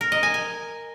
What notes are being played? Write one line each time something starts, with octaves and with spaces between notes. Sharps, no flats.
A#4
D#5
G#5
G#5